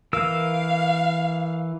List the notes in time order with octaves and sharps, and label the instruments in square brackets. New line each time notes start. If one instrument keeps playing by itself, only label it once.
[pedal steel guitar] E3 A#4 E6 [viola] F5